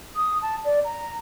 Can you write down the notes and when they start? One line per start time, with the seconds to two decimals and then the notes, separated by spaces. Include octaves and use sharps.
0.15 D#6
0.41 A5
0.64 D5
0.84 A#5